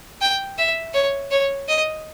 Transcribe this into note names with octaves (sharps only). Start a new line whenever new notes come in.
G5
E5
C#5
C#5
D#5